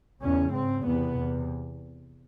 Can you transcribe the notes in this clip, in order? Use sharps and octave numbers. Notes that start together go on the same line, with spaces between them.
E2 C#3 C#4
G#2 C4
E2 C3 B3
E2 C3